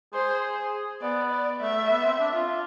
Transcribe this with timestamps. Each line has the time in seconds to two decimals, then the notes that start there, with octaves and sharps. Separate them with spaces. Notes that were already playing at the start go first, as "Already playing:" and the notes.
0.13 G#4 C5
1.02 B3 D5
1.31 D5
1.61 A3 E5
1.75 A3
1.90 B3
2.05 C4
2.20 D4
2.34 F4